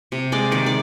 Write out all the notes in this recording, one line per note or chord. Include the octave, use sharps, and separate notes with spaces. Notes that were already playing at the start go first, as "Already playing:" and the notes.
C3
G#3 D5
D#3 D5
D5